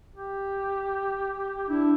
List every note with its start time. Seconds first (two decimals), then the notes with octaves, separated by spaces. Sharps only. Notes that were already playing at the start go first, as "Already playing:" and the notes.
0.16 G4
1.69 D4 E4